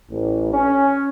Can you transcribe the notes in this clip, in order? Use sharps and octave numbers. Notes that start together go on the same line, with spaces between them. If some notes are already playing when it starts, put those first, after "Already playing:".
A1
C#4